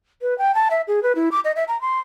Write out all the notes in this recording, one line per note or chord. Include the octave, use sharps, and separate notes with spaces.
B4
G5
A5
E5
G#4
B4
E4
D6
D#5
E5
A#5
C6